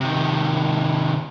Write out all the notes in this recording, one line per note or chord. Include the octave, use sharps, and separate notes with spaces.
C3 D#3